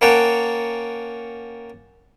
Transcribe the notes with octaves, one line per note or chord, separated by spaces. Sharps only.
A#3 C#4 A#4 F#5 G5 A5